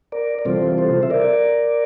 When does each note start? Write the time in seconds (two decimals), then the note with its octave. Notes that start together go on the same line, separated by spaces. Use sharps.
0.12 A#4 D5
0.39 D5
0.45 C3 E3 G3 C4 F4 A4 C5
0.78 A4 C5
1.03 E5
1.10 A#4 D5